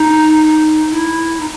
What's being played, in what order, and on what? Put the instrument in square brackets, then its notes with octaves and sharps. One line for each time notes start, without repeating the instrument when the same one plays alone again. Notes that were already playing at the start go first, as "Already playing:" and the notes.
Already playing: [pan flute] D#4
E4
D#4